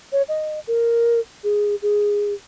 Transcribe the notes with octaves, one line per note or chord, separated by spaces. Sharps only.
C#5
D#5
A#4
G#4
G#4